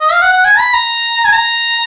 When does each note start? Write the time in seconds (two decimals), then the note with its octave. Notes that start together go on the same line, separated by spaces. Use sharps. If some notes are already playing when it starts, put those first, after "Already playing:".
0.01 D#5
0.12 F5
0.22 F#5
0.33 F#5
0.45 G#5
0.59 B5
0.74 A#5
1.25 G#5
1.32 A#5